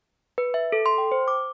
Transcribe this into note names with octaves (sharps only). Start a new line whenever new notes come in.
B4
E5
A4
C6
G5
C5
D6